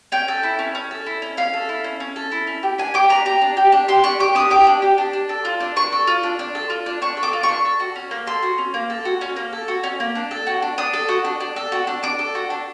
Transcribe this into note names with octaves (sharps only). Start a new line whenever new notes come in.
C#4 G5
A4
E4
C#4
C#4
A4
E4
C#4
C#4 F5
A4
E4
C#4
C#4
A4
E4
C#4
G4
D4 G#5
G4 D6
D4 A#5
G4 A#5
D4
G4
D4
G4 C6
D4 C#6
G4 D6
D4 D#6
G4 D6
D4
G4
D4
D4
A4
F4
D4
D4 C#6
A4
F4
D4
D4
A4
F4
D4
D4 C#6
A4
D6
F4
C#6
D4
A4
F#4
C#4
A#3
A4 C6
F#4
C#4
A#3
A4
F#4
C#4
A#3
A4
F#4
C#4
A#3
D4
A4
F#4
D4
D4 D#6
A4
F#4
D4
D4
A4
F#4
D4
D4 D6
A4
F#4
D4